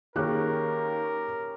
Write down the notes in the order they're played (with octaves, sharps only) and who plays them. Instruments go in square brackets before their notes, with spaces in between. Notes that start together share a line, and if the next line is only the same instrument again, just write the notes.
[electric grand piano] D#3 A#3 [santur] C#4 G4 [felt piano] G#4 F#6 [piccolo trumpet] A#4